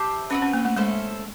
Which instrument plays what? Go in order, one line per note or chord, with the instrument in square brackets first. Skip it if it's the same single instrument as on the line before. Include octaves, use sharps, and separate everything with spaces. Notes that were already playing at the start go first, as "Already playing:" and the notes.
Already playing: [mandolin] G4 C5 E5 A5
[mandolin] C4 D#4 F#4 B4 [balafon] C#4
[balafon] C#4
A#3
A3
[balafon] G#3 [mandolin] C#4 E4 A4 C5